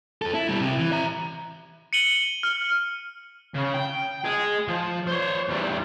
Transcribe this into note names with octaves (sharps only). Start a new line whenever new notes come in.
F2 A4
E4
B2 G3
C3 E4
E3
E5 A#5
C#7 D#7 F#7 G7
F6
C#3
G5
G#4 D#5
F3
C5 C#5
E2 G3